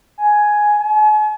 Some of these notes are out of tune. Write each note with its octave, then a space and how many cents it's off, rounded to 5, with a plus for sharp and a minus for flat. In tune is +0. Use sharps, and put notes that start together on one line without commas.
G#5 +5
G#5 +40